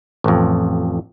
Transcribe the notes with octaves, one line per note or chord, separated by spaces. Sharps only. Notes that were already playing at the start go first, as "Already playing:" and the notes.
A1 F2